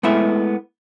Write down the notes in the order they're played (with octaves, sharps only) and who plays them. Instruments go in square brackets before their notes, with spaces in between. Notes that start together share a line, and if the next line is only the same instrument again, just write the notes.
[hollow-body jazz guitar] G#3 A3 B3 E4 E5